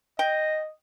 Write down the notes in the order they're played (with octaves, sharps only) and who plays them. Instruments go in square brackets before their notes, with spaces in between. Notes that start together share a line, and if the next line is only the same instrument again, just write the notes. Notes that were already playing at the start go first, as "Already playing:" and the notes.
[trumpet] D#5 [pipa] G5